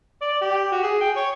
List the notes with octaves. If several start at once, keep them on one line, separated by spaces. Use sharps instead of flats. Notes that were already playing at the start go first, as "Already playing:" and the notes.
D5
G4
F#4
G#4
G5
C#5